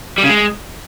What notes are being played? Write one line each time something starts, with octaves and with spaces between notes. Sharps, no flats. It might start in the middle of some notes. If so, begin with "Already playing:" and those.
G3
C#3
G#3